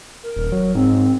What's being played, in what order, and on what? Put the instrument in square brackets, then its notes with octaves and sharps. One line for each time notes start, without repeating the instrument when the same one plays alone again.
[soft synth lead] A#4
[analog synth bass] D#1
F#3
[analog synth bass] G#2 [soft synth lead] C4